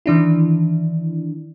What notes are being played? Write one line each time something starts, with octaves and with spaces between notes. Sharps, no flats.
D#3 E3 D4 E4